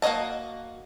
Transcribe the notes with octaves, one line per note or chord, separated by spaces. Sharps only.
A#3 F#4 C#5 D#5 A5